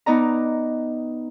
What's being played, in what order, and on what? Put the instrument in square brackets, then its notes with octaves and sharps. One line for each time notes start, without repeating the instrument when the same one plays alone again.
[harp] B3 D#4 D5 A#5